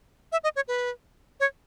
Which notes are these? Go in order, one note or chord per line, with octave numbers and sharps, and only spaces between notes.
E5
D#5
C#5
B4
C#5